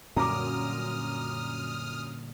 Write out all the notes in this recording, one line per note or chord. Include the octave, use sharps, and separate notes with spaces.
F#2 A#2 D3 G3 A#5 D6 D#6 F6